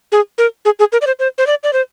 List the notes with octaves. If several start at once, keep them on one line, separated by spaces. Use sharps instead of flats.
G#4
A#4
G#4
G#4
A#4
D5
C5
C5
C5
D5
D5
C5